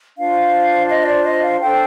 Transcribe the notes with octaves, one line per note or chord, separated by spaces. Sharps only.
D4 F4 C5 F5
D#5
D#5
D5
D#5
F5
D4 A4 C5 G5